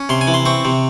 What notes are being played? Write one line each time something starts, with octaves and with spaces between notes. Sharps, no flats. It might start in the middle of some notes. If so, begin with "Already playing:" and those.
Already playing: C#4
C3 C6
G#5
E3
C6
C4 C#6
C3